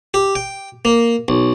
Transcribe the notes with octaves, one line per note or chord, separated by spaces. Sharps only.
G4
G5
A#3
B1